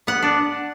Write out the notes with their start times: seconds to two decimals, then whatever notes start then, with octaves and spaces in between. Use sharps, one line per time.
0.07 B3 F#5
0.22 D4